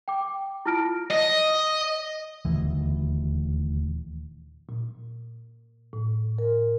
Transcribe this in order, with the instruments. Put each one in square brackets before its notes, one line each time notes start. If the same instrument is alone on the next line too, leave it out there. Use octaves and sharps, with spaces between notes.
[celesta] G5 D6
E4 F4 A5 F6 A#6 D7
[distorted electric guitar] D#5
[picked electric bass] D#1 D2 D#3 E3
[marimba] A#2
A2
A#4